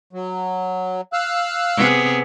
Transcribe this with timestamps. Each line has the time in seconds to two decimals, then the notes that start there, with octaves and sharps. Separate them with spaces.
0.13 F#3
1.13 F5 E6 F#6
1.76 C3 B3 G#4